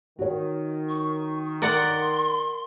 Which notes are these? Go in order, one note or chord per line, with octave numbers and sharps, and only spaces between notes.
D#3 F#4 C#5
C#6
A#4 D5 F#5 C6